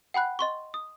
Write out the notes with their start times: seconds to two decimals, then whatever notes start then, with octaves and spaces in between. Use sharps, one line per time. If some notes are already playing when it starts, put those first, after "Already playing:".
0.14 F#5 G5 B5 F#6
0.39 D#5 C6 C#6
0.74 D#6